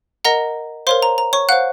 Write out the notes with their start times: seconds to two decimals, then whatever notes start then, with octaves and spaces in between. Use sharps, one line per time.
0.25 A#4 D#5 F#5 A#5 A#6
0.87 A#4 C5 C#5 F5 C6
1.02 A#5
1.18 A#5
1.33 C#5 C#6
1.49 C5 F5 F#5 F#6